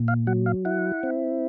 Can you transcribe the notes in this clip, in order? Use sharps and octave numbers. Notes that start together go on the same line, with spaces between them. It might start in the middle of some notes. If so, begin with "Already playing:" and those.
Already playing: A#2
F5
F#3 F#5
F5
E4 F#5
C4